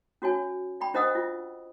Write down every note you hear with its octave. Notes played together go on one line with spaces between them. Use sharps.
C#4 F#4 C#5 G#5
D5 G5 B5
D4 C5 D#5 F#5 D#6 E6
F4